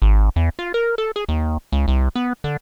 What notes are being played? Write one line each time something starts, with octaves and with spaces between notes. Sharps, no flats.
G#1
E2
F4
A#4
A4
G#4
D#2
C#2
C2
B3
D3